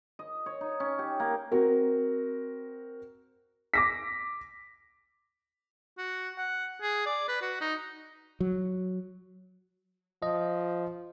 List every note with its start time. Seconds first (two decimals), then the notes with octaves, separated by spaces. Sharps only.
0.19 D#5
0.46 C#5
0.61 D#4
0.80 C#4
0.99 G4
1.20 A#3
1.52 C4 F#4 A#4
3.74 D6 A#6 B6
5.98 F#4
6.38 F#5
6.82 G#4
7.06 D5
7.28 B4
7.42 F#4
7.61 D#4
8.40 F#3
10.22 F3 D#5